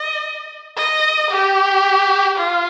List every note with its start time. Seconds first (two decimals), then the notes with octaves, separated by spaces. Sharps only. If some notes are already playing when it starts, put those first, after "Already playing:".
Already playing: D#5
0.76 D#5
1.31 G4
2.36 F4